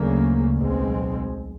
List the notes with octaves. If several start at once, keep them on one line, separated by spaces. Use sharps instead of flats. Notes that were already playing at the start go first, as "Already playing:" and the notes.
Already playing: D2 C#3 F#3 A#3
B1 B2 G#3 C4